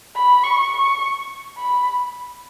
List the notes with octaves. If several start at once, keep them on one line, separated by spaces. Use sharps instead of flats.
B5
C#6
C#6
B5